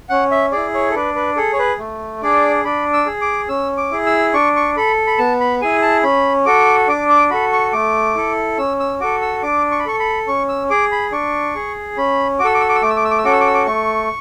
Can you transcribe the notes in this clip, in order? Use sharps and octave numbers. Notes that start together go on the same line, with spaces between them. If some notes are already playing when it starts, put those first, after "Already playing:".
C#4 F#5
E5
E4 G#4 D5
C#5
A4
D4 B4
B4
G#4 A4
C#5
B4
A3
D4 G#4 D5
D4 B5
E6
G#4
D6
C#4 E6
D6
E4 G#4
E6
D4 C#6
C#6
A4 B5
B5
B3 A5
B5
E4 G#4 G#5
A5
C#4 B5
F#4 A4 D6
D4 D6
D6
F#4 A4 B5
C#6
A3 D6
E4 A4
C#4 E6
E6
F#4 A4 D6
E6
D4 D6
C#6
B5
A4 C#6
B5
C#4 C#6
E6
G#4 D6
B5
D4 C#6
G#4
C#4 B5
F#4 D6
A4 E6
D6
E6
D6
E6
A3 D6
E6
D6
E6
D6
E6
C#4 F#4 A4 D6
E6
D6
E6
D6
A3 C#6